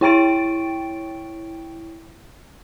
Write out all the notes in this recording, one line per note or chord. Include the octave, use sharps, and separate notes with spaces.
E4 C#5 G5 C#6 A6 D7